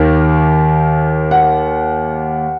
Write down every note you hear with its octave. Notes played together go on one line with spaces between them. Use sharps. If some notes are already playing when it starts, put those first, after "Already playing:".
Already playing: D#2 D#3 A#3
F#5